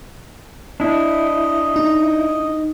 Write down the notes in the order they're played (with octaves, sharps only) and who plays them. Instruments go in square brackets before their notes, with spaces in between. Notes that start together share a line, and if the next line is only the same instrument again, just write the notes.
[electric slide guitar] D4 E4 [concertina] D#5
[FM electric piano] D#4